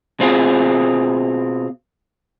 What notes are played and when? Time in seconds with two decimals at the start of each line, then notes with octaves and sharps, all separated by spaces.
0.20 B2 C4 F4 G#4